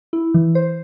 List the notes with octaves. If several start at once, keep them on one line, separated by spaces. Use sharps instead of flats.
E4
E3
C5